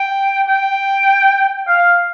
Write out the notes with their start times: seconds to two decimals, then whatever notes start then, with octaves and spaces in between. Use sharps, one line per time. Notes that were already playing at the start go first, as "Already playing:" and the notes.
Already playing: G5
0.47 G5
1.68 F5